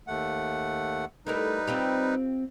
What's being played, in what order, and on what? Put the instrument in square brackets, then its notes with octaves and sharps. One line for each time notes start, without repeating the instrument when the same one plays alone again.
[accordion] D#2 A3 F#5
[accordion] G3 D#4 B4 [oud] A3 E4 A#4
[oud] C4 F4 G4